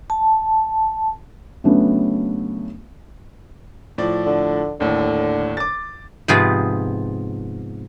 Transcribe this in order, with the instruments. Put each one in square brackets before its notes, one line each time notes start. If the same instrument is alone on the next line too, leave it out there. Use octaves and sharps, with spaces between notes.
[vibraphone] A5
[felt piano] C#3 F#3 A3 B3 D4
[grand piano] A2 F3 D5
[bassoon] D3
[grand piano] D#2 A2 [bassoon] D3
[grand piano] D6 A6
[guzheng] G#2 C3 F3 B3 F4 G#4